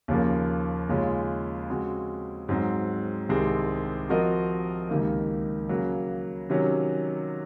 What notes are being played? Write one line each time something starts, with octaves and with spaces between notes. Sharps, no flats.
D#2 C#3 F3 A#3
D#2 C#3 G#3 C#4 F4
C#3 G#3 C4 F#4
G#2 F#3 C4
C2 C3 D#3 G#3 C4
F3 C4 F#4 A#4 D#5
C#2 C3 D#3 A#3
C#3 F#3 A#3
C3 D#3 F#3 C#4